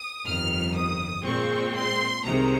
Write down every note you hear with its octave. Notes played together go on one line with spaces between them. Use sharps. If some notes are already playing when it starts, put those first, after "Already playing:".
Already playing: D#6
G1 F2 D#3 F6
D#6
A#2 G#3 C4 C#6
C6
C2 C3 D#3 G#3 A#5